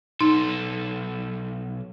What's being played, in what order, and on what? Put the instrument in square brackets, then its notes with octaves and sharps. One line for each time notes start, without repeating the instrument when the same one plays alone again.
[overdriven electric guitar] B1 A4 [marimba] D#4